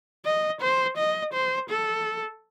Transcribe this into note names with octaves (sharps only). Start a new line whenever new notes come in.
D#5
C5
D#5
C5
A4